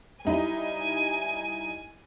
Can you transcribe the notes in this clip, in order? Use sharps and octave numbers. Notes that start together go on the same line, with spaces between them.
G3 D#4 E4 G#5